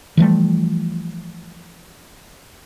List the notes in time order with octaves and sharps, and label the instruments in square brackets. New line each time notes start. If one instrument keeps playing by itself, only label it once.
[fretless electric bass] E3 F3 G3 A3